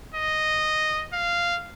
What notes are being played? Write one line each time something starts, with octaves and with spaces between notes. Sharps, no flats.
D#5
F5